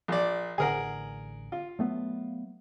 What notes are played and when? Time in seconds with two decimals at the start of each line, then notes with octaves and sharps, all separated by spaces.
0.08 A#1 D5
0.58 A1 D3 G#4 A#4 F#5
1.52 F4
1.79 F#3 A3 B3